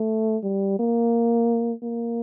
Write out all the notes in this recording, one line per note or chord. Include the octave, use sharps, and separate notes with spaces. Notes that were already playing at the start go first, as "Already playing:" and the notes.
Already playing: A3
G3
A#3
A#3